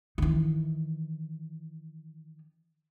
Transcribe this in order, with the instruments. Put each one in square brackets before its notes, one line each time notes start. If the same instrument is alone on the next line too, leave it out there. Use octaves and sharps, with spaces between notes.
[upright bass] D#3 E3